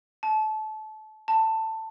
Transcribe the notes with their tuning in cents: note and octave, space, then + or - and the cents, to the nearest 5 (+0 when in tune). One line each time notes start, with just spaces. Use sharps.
A5 -25
A5 +15